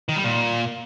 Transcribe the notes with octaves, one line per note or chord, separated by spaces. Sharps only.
D#3
G3
A#2